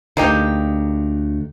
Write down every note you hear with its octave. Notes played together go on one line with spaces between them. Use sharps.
D2 D3 A#3 D#4 G4